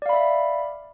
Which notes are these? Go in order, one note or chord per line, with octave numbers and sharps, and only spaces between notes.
D5 E5 F5 B5